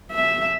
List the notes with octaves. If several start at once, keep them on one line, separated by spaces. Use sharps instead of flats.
E5